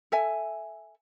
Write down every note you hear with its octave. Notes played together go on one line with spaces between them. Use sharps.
A4 E5 G#5